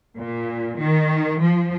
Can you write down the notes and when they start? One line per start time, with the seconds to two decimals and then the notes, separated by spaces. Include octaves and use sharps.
0.16 A#2
0.78 D#3
1.41 F3